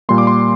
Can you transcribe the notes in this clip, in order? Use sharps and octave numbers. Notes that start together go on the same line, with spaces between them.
A#2 G3 A#3 C6
D6
C6